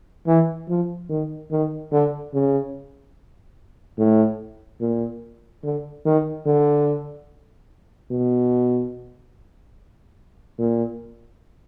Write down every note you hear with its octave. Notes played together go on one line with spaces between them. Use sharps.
E3
F3
D#3
D#3
D3
C#3
A2
A#2
D3
D#3
D3
B2
A#2